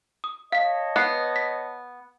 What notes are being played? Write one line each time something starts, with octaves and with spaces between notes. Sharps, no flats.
D#6
C#5 D#5 F5 A5 B6
B3 F#6 C7
B6